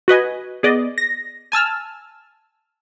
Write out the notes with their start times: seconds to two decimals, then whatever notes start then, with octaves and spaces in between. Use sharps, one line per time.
0.08 F#4 B4 D#5 G#5
0.63 B3 G#4 D5 D#5
0.98 A#6
1.52 G#5 A5 E6 F6